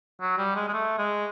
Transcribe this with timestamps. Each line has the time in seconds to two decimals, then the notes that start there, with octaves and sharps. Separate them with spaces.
0.21 F#3
0.38 G3
0.55 G#3
0.68 G#3
0.73 A3
0.99 G#3